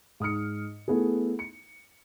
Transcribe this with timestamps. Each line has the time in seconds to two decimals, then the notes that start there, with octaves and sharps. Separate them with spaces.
0.20 G#2 D#6 F6 C#7
0.88 A3 B3 E4 G#4
1.39 C#7